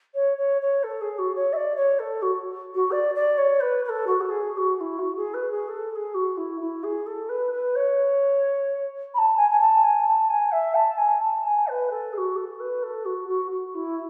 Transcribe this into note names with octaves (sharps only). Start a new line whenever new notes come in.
C#5
C#5
C#5
A4
G#4
F#4
C#5
E5
D5
C#5
A4
F#4
F#4
D5
D5
C#5
B4
B4
A4
F#4
A4
G#4
G#4
F#4
F#4
E4
F#4
G#4
B4
G#4
A4
A4
G#4
F#4
E4
E4
G#4
A4
B4
B4
C#5
B5
A5
G#5
G#5
A5
G#5
A5
G#5
E5
A5
G#5
A5
A5
G#5
B4
A4
G#4
F#4
A4
B4
A4
F#4
F#4
F#4
E4